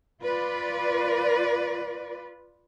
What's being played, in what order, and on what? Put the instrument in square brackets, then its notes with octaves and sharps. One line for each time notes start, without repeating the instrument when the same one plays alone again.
[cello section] F4 B4 D5